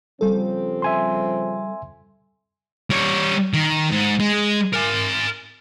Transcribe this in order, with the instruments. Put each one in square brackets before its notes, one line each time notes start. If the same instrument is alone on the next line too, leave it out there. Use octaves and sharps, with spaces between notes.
[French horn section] C#3 F3 C4 [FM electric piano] G3 A4
[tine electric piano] E5 G#5 C6
[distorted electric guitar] G3 C#5
D#3
G#2
G#3
A#4 G#5